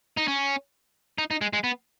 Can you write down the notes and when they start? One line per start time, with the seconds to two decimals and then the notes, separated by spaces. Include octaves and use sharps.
0.17 D#4
0.28 C#4
1.18 D#4
1.31 D#4
1.41 G#3
1.53 G#3
1.64 B3